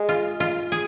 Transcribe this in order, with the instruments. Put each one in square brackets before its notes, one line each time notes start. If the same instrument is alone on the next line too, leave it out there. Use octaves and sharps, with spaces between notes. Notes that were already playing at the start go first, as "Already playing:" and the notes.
Already playing: [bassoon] G#3
[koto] F4
F4
G#4